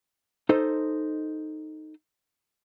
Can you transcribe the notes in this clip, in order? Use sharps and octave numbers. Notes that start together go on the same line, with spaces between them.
D#4 A4 C5 D#5